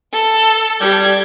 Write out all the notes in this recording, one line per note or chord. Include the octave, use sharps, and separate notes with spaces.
A4
G3 G4 G#6